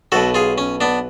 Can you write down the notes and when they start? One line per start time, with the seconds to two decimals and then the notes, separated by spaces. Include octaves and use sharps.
0.12 B1 B2 F#4 A4
0.34 F4 G#4
0.58 C#4
0.81 B3 D4